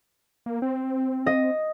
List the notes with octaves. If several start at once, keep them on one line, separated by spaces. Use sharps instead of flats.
A#3
C4
D#5